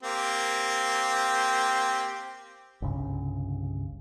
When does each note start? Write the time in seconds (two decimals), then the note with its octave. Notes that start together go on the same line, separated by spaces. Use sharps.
0.03 A#3 C4 G4
2.82 G1 C2 C#3